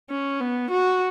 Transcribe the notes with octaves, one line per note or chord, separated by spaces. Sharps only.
C#4
B3
F#4